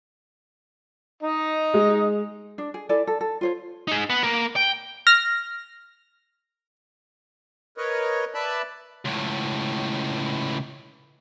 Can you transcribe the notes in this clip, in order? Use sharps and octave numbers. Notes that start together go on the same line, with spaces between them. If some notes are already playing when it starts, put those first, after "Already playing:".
D#4 D#5
G#3
D4
G#4
E4 A4 D5 G#5
A4
A4
F4 C5 C#5
D#4 G#4
B4 F#5
A#3 A#4
G5
F6 A#6
A#4 B4 C#5 D#5
B4 D5 E5 A5 B5
C#2 A2